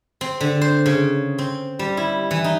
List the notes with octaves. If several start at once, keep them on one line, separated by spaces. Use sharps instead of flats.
C4
D3
C5
C#3
C4
G3
E4
E3
D#4